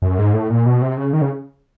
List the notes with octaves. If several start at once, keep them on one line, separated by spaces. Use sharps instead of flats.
F#2
G#2
A2
A#2
B2
C3
C#3
D#3
C#3